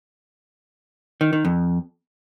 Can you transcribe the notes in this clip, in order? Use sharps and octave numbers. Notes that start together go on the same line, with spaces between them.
D#3
D#3
F2